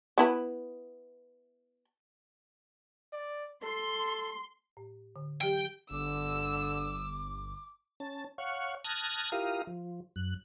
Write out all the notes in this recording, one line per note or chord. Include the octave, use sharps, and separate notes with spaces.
B3 E4 B4
D5
A4 C6
A2
D3
E3 F#3 G4 G5
G1 D3 D6 E6
C#4 A5
C#5 F5 F#5 C#6
A5 D#6 F6 F#6 G#6 A#6
E4 F4 G4 A#4 F5 D#6
F3
F#2 F#6